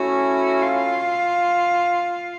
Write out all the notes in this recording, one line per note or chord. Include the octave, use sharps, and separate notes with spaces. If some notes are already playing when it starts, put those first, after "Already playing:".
Already playing: A3 C#4 E4 F#4
F4